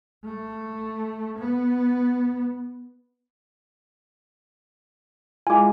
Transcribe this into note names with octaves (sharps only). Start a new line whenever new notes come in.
A3
B3
G#3 E4 F4 G#5 D6